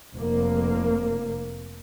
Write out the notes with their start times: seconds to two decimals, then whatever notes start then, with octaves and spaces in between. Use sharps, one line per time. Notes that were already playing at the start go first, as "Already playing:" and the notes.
0.15 F1 A#3